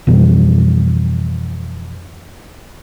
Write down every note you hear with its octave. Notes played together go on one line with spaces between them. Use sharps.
F2 B2 E3 G3